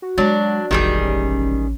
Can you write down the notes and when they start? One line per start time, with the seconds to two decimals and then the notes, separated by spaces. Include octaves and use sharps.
0.02 F#4
0.18 F#3 G#3 D4
0.71 E1 A1 D#3 G3 G#4
1.03 C#4